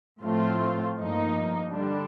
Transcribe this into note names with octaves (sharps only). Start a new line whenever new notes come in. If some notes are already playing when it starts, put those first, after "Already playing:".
A2 F3 A3 C4 F4
G2 F3 A#3 D#4
D3 G3 D4